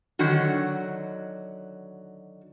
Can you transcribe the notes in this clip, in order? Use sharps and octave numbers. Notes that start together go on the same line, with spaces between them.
D3 D#3 F#3 F#4